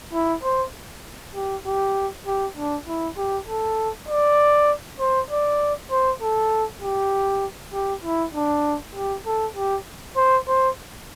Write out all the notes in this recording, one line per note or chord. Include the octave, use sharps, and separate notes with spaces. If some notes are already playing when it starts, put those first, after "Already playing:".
E4
C5
G4
G4
G4
D4
E4
G4
A4
D5
C5
D5
C5
A4
G4
G4
E4
D4
G4
A4
G4
C5
C5